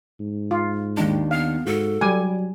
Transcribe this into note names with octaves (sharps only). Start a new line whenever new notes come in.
G#2
F4
D#2 D#3 G#3 D4
B3 F5
G#2 F#4 A4
F#3 G3 G#5 D6